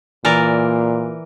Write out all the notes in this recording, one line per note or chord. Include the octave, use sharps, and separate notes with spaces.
A#2 E3 A#4 D5